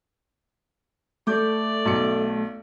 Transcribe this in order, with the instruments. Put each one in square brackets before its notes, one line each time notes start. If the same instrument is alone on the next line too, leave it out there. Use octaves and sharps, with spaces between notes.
[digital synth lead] A3 [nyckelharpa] D5 [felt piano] D6 G6
[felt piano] B1 C#7